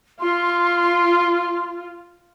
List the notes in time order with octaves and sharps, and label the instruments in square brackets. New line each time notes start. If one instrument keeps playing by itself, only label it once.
[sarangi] F4 [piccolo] C6